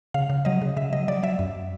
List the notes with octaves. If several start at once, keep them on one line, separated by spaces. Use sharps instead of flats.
C#3 F5
C#3
F#3 D#5
C#3
C#3 E5
F#3 D#5
F#3 D5
F#3 E5
F#2